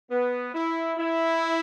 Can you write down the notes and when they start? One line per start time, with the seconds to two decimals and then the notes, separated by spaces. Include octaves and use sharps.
0.11 B3
0.54 E4
0.98 E4